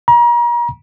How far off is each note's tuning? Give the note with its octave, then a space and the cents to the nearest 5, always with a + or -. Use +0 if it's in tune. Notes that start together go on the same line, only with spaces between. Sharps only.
A#5 +35